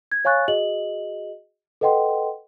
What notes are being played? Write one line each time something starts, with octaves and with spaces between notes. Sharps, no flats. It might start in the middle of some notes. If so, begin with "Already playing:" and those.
G#6
C#5 F5 G#5 C#6 F#6 A6
F#4 G#4 D#5 F#7
A4 B4 D#5 F#5 G5 C6